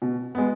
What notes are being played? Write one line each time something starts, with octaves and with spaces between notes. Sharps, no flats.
B2
G#3 B3